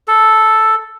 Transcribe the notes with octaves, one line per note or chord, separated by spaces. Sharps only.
A4